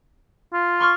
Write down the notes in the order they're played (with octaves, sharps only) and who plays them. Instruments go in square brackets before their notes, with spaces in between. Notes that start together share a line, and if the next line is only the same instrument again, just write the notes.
[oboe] F4
[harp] C6 C#6 F6